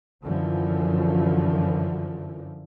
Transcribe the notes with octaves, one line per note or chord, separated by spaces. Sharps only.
F#2 D3 E3 F3